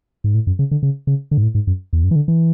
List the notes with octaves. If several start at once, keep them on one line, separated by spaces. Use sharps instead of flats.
G#2
A2
F#2
C#3
D3
C#3
C#3
D3
G#2
A2
G#2
F#2
E2
F#2
E3
D3
E3